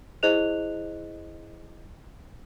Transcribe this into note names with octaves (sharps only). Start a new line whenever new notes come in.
E4 G#4 C5 D#5 F#6 F7